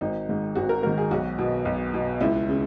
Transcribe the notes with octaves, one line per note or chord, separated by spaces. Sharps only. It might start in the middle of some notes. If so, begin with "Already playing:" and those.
G#1 D#4
G#2 D#3
G#1 F#4
A#4
G#2 D#3 A#4
G#4
B1 F#4
B2
B1
B2
C#2 E4
C#3